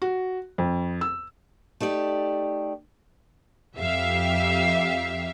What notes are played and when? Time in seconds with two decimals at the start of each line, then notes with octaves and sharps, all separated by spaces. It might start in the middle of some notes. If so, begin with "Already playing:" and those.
0.02 F#4
0.58 F2
1.01 E6
1.80 A3 D#4 G4 D5
3.76 F2 G4 E5 F5